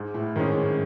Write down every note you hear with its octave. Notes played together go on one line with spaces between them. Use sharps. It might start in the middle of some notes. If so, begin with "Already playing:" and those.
Already playing: G#2
A2
G#2 D#3 G#3 C#4
F#2